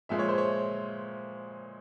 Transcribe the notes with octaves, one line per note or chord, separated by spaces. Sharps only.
A#2 F3 G#3 E5
C#5
C5
C#5